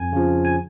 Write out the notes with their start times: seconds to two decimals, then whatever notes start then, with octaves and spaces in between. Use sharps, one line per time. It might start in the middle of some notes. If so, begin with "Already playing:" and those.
Already playing: F2 G#5
0.12 C#3 F3
0.45 G#5